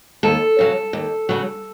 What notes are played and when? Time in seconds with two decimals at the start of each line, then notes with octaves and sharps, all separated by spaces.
0.23 D#2 A4
0.59 C#3 F#3
0.93 D#2
1.29 C#3 F#3